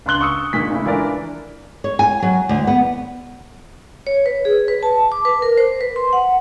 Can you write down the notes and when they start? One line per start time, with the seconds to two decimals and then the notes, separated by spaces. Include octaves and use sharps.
0.06 C#2 D4 C6 F#6 G7
0.21 C#6 D#6 E6 C#7
0.53 A#2 D#3 G#3 D4 G#5 B6
0.71 C#3 G#3 A3 E4
0.85 E3 D4 F4 A#4 D5
1.84 C#5
1.99 G#5
2.22 F#3
2.49 D2
2.67 B3
4.07 C#5
4.26 B4
4.45 G#4
4.68 B4
4.83 A5
5.12 D6
5.25 B4
5.42 A#4
5.57 C5
5.81 B4
5.96 C6
6.13 F#5